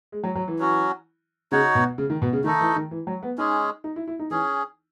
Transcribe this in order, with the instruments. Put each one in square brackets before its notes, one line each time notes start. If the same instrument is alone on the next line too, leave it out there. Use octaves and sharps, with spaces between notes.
[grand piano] G#3
F#3
F#3
E3
[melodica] F#3 C#4 F#4
[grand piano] C#3 [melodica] D#4 F#4 C#5 F#5
[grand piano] B2
C#3
D#3
B2
C#3
[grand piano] D#3 [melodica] A3 D#4 A4 D#5
[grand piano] E3
D#3
E3
F#3
B3
[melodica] G#3 C#4 G#4 [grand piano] D#4
[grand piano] D#4
E4
E4
D#4
[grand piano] E3 [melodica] C#4 G#4